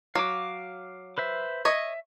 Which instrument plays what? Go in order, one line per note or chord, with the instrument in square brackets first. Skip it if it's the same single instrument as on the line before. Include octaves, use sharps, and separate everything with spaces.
[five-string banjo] F#3 [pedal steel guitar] F5 D6
[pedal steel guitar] B4 C5 E5
[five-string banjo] C#5 D#5 [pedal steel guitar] E5